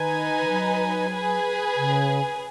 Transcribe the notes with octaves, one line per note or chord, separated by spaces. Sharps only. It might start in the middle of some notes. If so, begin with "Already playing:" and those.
Already playing: D#3 D#4 B4 G#5
D#3
F#3
G#4 B4 G#5
C#3